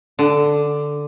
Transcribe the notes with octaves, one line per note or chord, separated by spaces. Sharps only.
D3